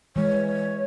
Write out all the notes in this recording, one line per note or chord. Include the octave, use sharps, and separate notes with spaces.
E3 G#3 C#5